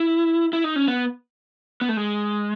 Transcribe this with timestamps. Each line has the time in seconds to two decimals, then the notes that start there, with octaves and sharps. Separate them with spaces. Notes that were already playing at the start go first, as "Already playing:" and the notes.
Already playing: E4
0.53 E4
0.64 D#4
0.76 C#4
0.88 B3
1.81 B3
1.89 A3
1.97 G#3